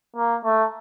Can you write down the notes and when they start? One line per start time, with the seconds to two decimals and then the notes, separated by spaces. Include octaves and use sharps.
0.16 A#3
0.45 A3